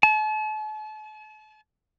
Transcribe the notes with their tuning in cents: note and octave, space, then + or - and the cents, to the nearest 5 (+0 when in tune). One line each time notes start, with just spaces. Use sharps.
A5 -40